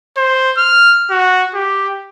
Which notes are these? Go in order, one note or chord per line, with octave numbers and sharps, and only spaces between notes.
C5
F6
F#4
G4